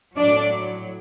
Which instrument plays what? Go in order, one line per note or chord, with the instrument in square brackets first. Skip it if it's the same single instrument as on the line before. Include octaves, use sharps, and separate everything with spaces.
[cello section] A2 F#3 D4 D5